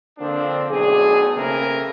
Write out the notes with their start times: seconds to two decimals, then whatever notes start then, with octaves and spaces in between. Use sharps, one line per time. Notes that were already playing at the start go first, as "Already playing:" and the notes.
0.18 D3 F3 A#3 C4 D4
0.71 B1 A2 D4 G#4
1.36 C#3 E3 A3 A#3 C4 A#4